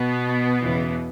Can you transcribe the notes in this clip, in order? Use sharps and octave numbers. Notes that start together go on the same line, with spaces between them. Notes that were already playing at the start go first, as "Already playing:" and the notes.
Already playing: B2 B3
E2 C#3 E3